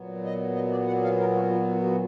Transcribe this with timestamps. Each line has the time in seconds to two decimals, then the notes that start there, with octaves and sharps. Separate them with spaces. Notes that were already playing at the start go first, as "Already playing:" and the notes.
Already playing: A#2 F#3 B3
0.24 D#5
0.55 D#5
0.71 D5
0.87 F#5
1.04 F5
1.20 A#4
1.35 F#4
1.52 F4
1.68 F#4
1.84 F#4